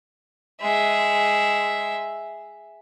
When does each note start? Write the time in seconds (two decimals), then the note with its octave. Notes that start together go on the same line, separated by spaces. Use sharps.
0.62 G#3 E5